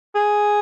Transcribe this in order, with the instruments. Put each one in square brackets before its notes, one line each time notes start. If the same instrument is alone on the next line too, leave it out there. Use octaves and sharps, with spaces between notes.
[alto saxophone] G#4